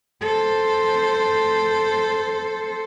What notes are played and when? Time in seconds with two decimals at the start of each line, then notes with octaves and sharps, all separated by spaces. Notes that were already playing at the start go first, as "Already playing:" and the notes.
0.23 A4 C5